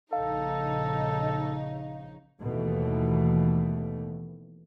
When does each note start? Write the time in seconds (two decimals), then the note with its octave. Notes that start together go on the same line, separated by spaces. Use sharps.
0.13 A#1 C#3 D#4 A4 F5
2.41 D#2 B2 E3 A3